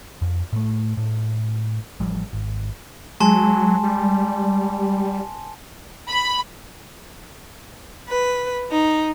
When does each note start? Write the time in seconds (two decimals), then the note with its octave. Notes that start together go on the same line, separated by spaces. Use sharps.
0.22 F2
0.53 A2 A3
0.97 A2
2.00 A1 F3 G3
2.33 G#1
3.20 F#3 G#3 G#5 A5 C6
3.83 G3
6.10 B5
8.09 B4
8.71 D#4